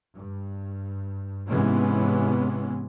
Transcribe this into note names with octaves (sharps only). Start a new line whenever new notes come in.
G2
G#2 C3 E3 G#3 B3 C#4